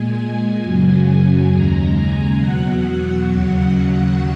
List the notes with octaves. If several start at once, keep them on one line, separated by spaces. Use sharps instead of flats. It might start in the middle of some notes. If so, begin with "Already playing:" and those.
Already playing: A#2 G#3 G#5
F#2 C#3 F#3
D#2 C#3 G#3 A#5
G#5
E2 B2 F#3 F#5
D#2 C#3 F#3